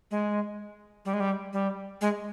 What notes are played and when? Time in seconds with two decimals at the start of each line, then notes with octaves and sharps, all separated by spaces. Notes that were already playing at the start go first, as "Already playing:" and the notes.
0.11 G#3
1.05 G3
1.13 G#3
1.20 G3
1.53 G3
2.01 G#3